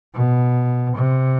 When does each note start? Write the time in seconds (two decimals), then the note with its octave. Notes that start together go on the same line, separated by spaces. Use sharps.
0.14 B2
0.95 C3